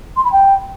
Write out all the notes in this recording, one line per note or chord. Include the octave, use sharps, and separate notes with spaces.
C6
B5
G5